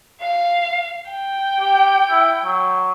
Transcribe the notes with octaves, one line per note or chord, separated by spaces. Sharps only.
F5
G5
G4
E4
F#3